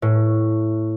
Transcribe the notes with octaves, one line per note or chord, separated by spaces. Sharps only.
A2